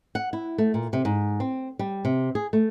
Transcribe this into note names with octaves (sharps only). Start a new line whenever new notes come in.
F#5
E4
A3
A#2
C3
G#2
C4
G3
C3
G#4
A3